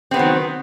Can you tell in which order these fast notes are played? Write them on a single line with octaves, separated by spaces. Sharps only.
C4 B3 F#3 D#3